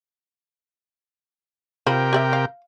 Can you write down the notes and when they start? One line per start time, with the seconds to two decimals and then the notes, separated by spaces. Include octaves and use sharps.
1.87 C3 F4 A#4 C5 G5 B5
2.13 G4 D5 E5
2.33 F5